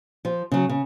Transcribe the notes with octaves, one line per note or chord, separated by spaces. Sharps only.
F3
C#3 F#3
C#3